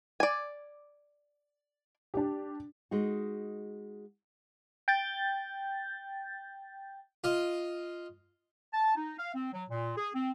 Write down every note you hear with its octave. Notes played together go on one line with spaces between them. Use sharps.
D5 G#5
D4 G4
G#3 D#4 F#4
G5 G6 A6
F4 D#5
A5
D#4
F5
C4
F#3
A#2
G#4
C4